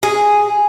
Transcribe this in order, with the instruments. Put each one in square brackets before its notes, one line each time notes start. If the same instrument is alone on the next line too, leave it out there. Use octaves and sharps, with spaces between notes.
[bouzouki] G#4